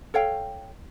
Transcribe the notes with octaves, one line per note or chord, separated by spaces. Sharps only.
A4 C#5 F5 G5